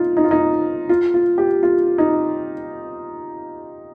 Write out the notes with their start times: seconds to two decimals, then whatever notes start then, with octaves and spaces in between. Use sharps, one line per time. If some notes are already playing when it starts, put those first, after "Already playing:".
Already playing: D#4 F4
0.17 D#4
0.24 F4
0.31 D#4
0.89 F4
1.14 F4
1.38 G4
1.63 F4
1.98 D#4